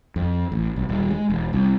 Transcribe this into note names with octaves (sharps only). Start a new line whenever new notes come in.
F2
A1
B1
D#1
G#3
E1
C2